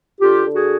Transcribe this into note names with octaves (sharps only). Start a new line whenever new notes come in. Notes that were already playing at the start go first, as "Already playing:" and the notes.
D3 F4 G4
D3
F#4 G#4